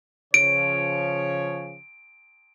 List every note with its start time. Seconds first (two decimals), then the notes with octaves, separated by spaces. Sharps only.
0.34 C#3 F3 C#5 D7